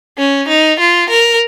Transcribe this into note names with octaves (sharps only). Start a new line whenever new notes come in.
C#4
D#4
F4
A#4